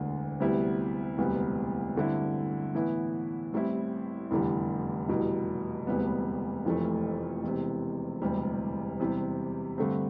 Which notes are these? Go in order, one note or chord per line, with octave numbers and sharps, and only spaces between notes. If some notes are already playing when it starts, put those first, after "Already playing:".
Already playing: E1 D2 D3
D2 C3 G3 B3 E4
E1 D2 C3 G3 B3
G2 D3 A3 C4 E4
A2 E3 B3 E4
A1 A2 G3 C4 E4
F1 E2 D3 G3
F1 E2 B2 G3
E1 D2 C3 G3 B3
F1 F2 E3 A3
E1 E2 C3
E1 D2 C3 G3
E2 C3 G3
G2 D3 A3 C4